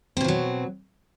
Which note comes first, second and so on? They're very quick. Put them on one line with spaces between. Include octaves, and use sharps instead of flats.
C4 B2 F3 F#3